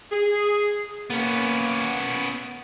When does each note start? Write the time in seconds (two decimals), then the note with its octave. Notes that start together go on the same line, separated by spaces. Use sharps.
0.12 G#4
1.10 A#3 B3 C#4